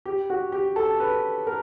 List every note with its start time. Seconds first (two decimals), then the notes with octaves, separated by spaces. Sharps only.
0.05 G4
0.30 F#4
0.52 G4
0.76 A4
1.00 B4
1.47 A#4